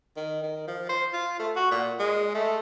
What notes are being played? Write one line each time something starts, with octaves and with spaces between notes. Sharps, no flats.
D#3
D#3
F3
C5
F4
A3
F#4
A#2
G#3
A3